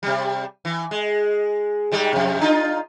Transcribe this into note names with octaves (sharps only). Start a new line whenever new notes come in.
C3 G3
E3
G#3
G#2 G3 G#3
F2 C3
D4 D#4 F4